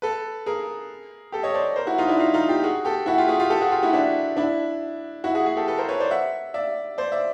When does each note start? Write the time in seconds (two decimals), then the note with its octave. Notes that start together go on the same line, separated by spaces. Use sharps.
0.02 A4 B4
0.46 G#4 A#4
1.32 G4 A4
1.43 C#5 D#5
1.54 C5 D5
1.76 A#4 C5
1.87 E4 F#4
1.98 D#4 F4
2.08 D4 E4
2.19 D#4 F4
2.34 D#4 F4
2.49 F4 G4
2.63 F#4 G#4
2.85 G4 A4
3.06 E4 F#4
3.18 F4 G4
3.28 F#4 G#4
3.40 F4 G4
3.50 G4 A4
3.61 F#4 G#4
3.71 F4 G4
3.83 E4 F#4
3.93 D4 E4
4.37 D4 E4
5.24 E4 F#4
5.35 F#4 G#4
5.46 F#4 G#4
5.57 G4 A4
5.67 A4 B4
5.78 A#4 C5
5.89 B4 C#5
6.00 C5 D5
6.11 E5 F#5
6.54 D5 E5
6.98 C5 D5
7.12 D5 E5